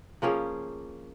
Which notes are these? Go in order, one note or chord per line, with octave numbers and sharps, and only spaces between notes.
F3 A#3 C#4 G#4